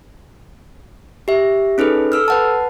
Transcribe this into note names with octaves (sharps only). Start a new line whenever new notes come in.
G4 E5
C#4 D#4 G#4 A4 B4
A4 E6 F6
B4 F#5 A5